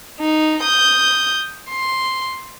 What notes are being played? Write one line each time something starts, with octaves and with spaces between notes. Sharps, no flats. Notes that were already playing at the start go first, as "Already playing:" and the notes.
D#4
D#6 G6
C6